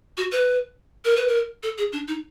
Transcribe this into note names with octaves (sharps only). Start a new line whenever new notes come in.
F#4
B4
A#4
B4
A#4
A4
G#4
D4
D#4